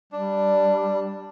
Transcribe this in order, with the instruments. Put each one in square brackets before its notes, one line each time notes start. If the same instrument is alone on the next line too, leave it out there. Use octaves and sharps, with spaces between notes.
[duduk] G3 [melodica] D4